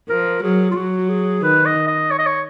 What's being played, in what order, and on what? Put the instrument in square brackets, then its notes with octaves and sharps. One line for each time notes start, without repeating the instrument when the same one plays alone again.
[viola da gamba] F3 [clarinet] A#4
[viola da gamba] F#3 [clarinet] G#4
[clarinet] F4
[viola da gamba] F#3 [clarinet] F#4
[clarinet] G#4
[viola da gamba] D#3 [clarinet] B4
[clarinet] D#5
D#5
C#5
D#5
C#5